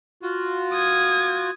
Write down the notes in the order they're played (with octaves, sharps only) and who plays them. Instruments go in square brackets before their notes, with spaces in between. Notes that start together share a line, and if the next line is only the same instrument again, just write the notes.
[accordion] F4 F#4
[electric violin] D#6 G#6